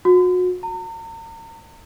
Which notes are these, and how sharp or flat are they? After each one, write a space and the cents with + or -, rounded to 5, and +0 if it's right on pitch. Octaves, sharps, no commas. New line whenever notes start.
F#4 -35
A#5 -40